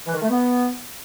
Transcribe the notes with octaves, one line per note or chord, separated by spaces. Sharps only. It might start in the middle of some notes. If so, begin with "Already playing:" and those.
E3
D#3
A3
B3